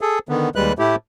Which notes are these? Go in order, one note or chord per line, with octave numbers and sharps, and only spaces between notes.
G#4 A4
D3 D#3 B3
D#2 G3 G#3 B4 F#6
A2 A3 E4 G4